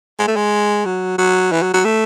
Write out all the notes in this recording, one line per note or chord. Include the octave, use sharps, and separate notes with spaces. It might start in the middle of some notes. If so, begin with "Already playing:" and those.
G#3
A3
G#3
F#3
F#3
E3
F#3
F#3
A3